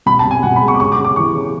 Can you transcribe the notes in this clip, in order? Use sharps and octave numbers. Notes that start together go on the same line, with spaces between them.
B2 B5
A5
B2
G#5
B2 F#5
B5
G#3
C#6
D6
C#3 C#6
D6
C#3
D6
E3 C#6
C#3